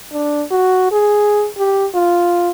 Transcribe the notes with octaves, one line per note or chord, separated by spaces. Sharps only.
D4
F#4
G#4
G4
F4